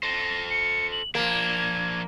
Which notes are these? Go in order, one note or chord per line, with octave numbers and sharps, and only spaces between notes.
A4 C5 A#6
C#7
F#7
F3 A#3 D4 G#6